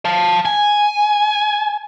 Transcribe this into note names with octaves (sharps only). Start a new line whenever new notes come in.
F5 A5
G#5